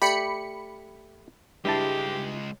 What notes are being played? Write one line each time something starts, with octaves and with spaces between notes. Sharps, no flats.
A3 G4 D5 B5 C#7
C#2 G2 G#3 E4 G4 A5